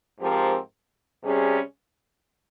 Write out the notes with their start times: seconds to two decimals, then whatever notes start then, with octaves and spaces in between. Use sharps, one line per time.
0.19 G#2 F3 C4 G4 A#4
1.22 C3 G3 C#4 G#4